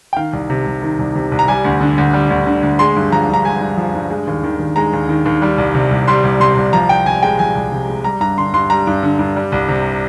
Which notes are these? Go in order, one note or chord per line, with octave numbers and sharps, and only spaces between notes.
G5
D#3 F5
C2
C3
C2
D#3
C2
C3
C2
A#5
G3 G#5
D2
D3
D2
G3
D2
D3
D2
G#3 C6
G2
F3 A#5
G2 A#5
G#3 G#5
G2
F3
G2
G#3
D#2
D#3
D#2
G#3 A#5
D#2
D#3
D#2
G3
C2
C3
C2
G3 C6
C2
C3 C6
C2
F3 A#5
C2 G5
C3 G#5
G#3 G5
F3 G#5
C2
C3
G#3
G3 A#5
G2 A#5
D3 C6
G2 C6
G3 A#5
G2
D3
G2
G3
C2
C3